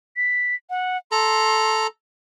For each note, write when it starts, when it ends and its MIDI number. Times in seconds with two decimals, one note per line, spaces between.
0.17 0.55 95
0.70 0.97 78
1.12 1.87 69
1.12 1.87 82
1.12 1.86 84